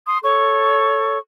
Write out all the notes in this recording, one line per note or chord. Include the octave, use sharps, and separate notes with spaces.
C6 D#6
A4 C#5 C#6